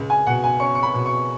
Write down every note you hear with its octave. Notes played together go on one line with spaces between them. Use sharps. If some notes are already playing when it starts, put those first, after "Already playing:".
Already playing: C#2
G#5
B2 F#5
G#5
C#4 C#6
C#6
B5
B2
C#6